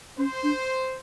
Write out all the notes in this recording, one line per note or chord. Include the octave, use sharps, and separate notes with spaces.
C#4 C5
D4